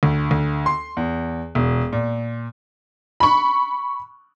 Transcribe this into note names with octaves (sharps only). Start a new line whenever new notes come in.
D2
D2
C6
E2
E1
A#2
B5 C#6